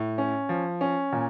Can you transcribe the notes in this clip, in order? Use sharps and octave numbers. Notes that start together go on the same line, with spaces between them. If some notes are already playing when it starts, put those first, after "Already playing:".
Already playing: A2
C#4
F3
C#4
A#2